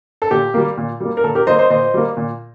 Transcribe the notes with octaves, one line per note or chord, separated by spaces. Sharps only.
A4
A#2 G4
G3 A#3
A#2
G3 A#3
A#4
A#2 A4
G4 A#4
G3 A#3 C5 D#5
C5 D#5
A#2 C5 D#5
G3 A#3
A#2